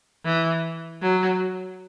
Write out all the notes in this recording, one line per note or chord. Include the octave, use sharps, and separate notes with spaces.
E3
F#3